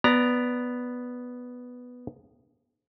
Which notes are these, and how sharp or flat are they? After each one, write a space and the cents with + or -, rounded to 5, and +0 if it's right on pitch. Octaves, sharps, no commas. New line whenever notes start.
B3 +0 D5 +0 A#5 +0